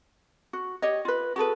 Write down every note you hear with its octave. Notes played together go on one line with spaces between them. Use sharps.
F#4
G4 C#5 D#5
F4 B4
F#4 G#4 A4 B4